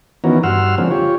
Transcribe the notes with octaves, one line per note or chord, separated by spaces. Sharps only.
D#3 E3 B3 C#4 F#4 A#4
G2 F#4 F#5 C6 E6 F6
D3 F3 G#3 A#3 C4 C#4
F4 G4 C#5